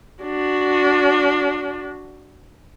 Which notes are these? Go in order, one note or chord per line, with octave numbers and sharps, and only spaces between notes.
D4 F#4